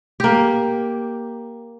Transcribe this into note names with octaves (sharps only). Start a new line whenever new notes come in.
A#3 G4